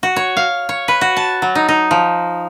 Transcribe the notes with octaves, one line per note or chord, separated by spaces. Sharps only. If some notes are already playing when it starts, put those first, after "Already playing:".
F#4
C#5
F5
C#5
B4
F#4
A5
F#3
D#4
D#4
F3